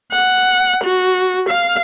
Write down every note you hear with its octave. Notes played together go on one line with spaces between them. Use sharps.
F#5
F#4
F5